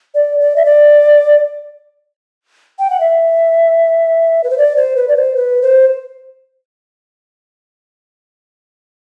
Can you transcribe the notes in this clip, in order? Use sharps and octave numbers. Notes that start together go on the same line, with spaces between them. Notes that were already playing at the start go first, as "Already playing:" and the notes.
D5
D5
E5
D5
G5
F#5
E5
B4
C5
D5
C5
B4
D5
C5
B4
C5